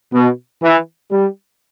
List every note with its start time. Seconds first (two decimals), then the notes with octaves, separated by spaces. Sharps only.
0.13 B2
0.62 E3
1.11 G3